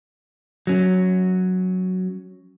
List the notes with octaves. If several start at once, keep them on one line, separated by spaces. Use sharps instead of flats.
F#3 C#4